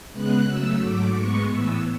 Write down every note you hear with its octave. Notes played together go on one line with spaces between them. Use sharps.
C#3 G#3 B3 F#6
C#3 F#3 A3 E6
G#2 F#3 A3 D6
G#2 G#3 B3 C#6
A2 E3 B3 E6